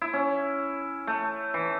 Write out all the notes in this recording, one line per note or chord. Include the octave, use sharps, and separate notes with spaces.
E4
C#4
A3
E3